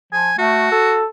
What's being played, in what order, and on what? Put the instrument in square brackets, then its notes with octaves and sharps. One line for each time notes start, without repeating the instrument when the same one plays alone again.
[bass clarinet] F3 [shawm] G#5
[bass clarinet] A3 [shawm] F#4
[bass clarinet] A4